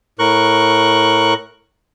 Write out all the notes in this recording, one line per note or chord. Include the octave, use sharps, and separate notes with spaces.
A2 A#4 C#6 F#6